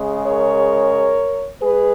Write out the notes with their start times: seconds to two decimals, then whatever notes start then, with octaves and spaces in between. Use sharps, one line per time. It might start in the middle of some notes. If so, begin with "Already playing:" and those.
Already playing: C#3 G#3
0.24 A#4 C#5
1.61 G#3 G#4 B4